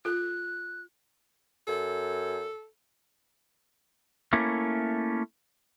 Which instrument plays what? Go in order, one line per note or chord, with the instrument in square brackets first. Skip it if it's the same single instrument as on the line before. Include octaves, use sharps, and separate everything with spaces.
[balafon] F4 A4 [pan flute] F#6
[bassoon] F#2 [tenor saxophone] A4
[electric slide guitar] A3 A#3 C#4 E4